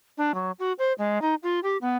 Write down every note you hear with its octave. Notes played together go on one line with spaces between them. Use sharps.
D4
F#3
F#4
C5
G#3
D#4
F4
G4
B3